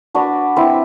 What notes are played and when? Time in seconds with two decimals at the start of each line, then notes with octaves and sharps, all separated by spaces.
0.14 D4 F#4 B4 D5
0.56 C4 E4 B4